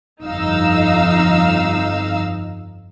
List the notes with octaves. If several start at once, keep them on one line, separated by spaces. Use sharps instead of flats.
G1 F2 D#4 F5 E6